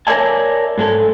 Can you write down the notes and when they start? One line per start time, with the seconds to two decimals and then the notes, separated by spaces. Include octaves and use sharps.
0.07 A#4 C#5 D5 E5 G#5 A5
0.78 G#2 G#3 A4